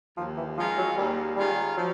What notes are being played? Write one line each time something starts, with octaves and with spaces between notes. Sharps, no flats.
D#2 F3
E3
D#3 F3 G#3 C#4 F4
F#3
D#2 G3
D#3 G3 G#3 C#4 F4
F3 F#3